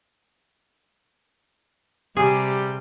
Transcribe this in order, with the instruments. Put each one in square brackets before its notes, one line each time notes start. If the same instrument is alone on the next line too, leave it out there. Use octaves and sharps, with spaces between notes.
[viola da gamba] C3 [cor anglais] G3 [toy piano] G4 [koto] G#4